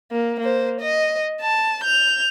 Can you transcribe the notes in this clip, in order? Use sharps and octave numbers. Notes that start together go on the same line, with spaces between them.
A#3
A#3 C5
D#5
A5
G6 F7